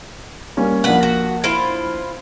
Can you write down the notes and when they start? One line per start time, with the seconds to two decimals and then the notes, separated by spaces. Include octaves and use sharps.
0.57 G3 A#3 C#4
0.84 A#1 A#3 B4 F#5
1.03 F#4
1.44 E4 F4 C5